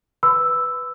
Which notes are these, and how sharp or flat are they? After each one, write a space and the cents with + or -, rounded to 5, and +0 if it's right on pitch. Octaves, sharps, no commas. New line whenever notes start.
B4 +0 B5 +40 E6 +0